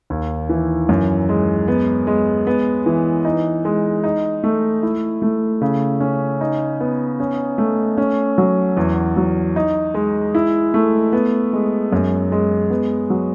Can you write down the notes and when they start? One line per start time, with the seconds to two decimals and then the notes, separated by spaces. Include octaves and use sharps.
0.10 D#2
0.49 E3
0.89 F#2
1.29 G#3
1.68 B3
2.07 G#3
2.47 B3
2.86 E3
3.25 D#4
3.65 G#3
4.04 D#4
4.44 A3
4.83 E4
5.22 A3
5.61 C#3
6.00 C#4
6.41 D#4
6.80 B3
7.20 C#4
7.58 A3
7.98 C#4
8.38 F#3
8.77 E2
9.17 F#3
9.56 D#4
9.94 G#3
10.35 E4
10.74 A3
11.13 B3
11.53 G#3
11.93 F#2
12.32 G#3
12.70 B3
13.10 F#3